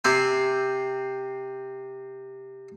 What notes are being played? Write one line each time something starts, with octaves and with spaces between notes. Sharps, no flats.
C3 C4 G#5